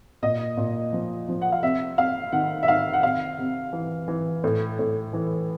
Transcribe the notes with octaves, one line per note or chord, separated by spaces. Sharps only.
A#2 D#5
A#2
F3
F3
F#5
F5
C3 E5
C3 F5
D#3 F#5
E5
D#3 F5
F#5
C3 F5
C3
E3
E3
A2
A2
E3